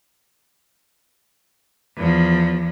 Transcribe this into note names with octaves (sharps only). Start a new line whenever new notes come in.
E2 F3